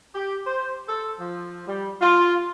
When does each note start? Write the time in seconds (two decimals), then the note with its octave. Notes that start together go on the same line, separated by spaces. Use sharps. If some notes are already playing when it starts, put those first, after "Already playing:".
0.15 G4
0.46 C5
0.88 A4
1.19 F3
1.66 G3
2.01 F4